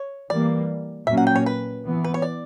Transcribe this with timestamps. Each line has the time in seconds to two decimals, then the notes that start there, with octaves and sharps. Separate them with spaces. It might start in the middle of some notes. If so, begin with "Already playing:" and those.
Already playing: C#5
0.30 E3 G3 A#3 D5
1.07 A#2 F#3 A#3 C#4 E5
1.17 F#5
1.27 G5
1.36 C#5
1.46 B4
1.84 E3 B3
2.04 B4
2.14 C#5
2.22 D5